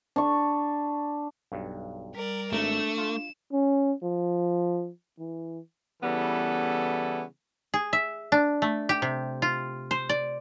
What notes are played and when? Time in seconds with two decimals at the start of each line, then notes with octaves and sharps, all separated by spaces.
0.16 D4 C#6
1.52 B1 G2
2.15 G3 A#4 D5
2.53 G#1 A3 D4 A#5 E7
2.97 F4 E7
3.53 C#4
4.03 F3
5.19 E3
6.03 C#3 E3 G3 B3 E4 A4
7.74 G#4
7.93 E5
8.32 D4
8.62 A3
8.89 G4
9.02 C3
9.42 F4
9.91 C5
10.09 D5